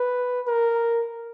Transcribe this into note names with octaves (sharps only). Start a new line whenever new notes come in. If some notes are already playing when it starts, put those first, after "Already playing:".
Already playing: B4
A#4